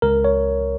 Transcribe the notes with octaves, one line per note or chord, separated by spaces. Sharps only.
C#2 A#4
C#5